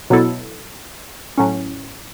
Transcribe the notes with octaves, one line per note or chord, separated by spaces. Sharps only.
B2 F#3 B3 E4 A4
A2 F#3 C#4